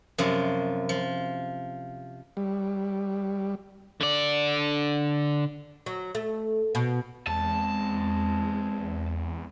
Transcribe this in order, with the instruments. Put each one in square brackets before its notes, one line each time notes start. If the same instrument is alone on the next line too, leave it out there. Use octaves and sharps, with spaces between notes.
[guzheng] F#2 C3 F3
F3
[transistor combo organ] G3
[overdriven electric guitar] D3 D5
[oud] F#3
A3
B2
[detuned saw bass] E2 [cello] G#3 C4 [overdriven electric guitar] A5